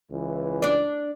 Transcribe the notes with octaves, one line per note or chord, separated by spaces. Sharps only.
C#2 E3
D4 D5